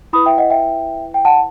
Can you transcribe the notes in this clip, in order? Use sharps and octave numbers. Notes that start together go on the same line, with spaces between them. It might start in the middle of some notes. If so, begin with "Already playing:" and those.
E4 B4 B5 D#6
E5 G5
D#5 F#5
E5 G5
G5
F#5 A5